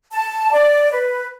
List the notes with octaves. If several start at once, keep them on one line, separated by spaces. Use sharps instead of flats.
A5
D5
B4